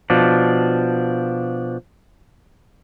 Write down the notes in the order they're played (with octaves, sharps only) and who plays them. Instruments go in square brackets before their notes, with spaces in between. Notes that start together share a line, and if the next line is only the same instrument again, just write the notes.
[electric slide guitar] B2 F3 D4